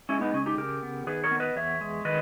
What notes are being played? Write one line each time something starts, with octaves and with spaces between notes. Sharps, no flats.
G#3 C#4 E4
B3 D#4
C#3 C#4
D#4 G4
C#3 G4 A#4
B3
D#3 G#4 B4
A#4 C#5
B3
B4 D#5
E2 C#5 E5
G#3
D#3 B4 D#5